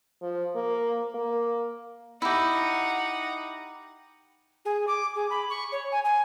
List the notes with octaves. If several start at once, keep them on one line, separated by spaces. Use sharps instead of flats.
F3
A#3
A#3
D#4 E4 G4 F#5
G#4
D6
G#4
B5
C#6
C#5
G#5
G#5